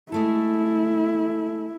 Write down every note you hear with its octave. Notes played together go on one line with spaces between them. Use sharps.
G#3 A3 E4 A4